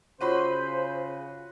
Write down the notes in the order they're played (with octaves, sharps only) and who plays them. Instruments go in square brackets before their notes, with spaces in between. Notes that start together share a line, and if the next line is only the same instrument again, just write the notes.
[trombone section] C#3 [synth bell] F4 C#5 D#7 [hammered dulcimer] F#4 B5 C6 [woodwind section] C5